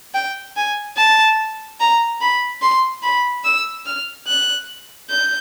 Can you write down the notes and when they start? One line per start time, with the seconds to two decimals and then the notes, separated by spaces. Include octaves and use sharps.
0.14 G5
0.56 G#5
0.97 A5
1.80 A#5
2.21 B5
2.62 C6
3.03 B5
3.45 E6
3.86 F6
4.28 F#6
5.10 G6